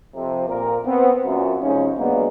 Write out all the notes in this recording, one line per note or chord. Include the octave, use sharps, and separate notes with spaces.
F2 C3
A#2 A#4
B3 C4
F#2 A#2
C3 F3 G#3 C#4 D#4
B2 F#3 G#3 A#3 B3 D4